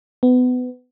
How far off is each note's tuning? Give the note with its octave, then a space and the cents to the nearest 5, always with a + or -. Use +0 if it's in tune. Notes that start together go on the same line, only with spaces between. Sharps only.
B3 +25